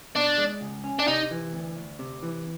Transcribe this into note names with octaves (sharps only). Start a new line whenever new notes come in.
B2 D4
G#3
C#2
C#4
D4
C3 D#4
E3
D2
D2
C3
E3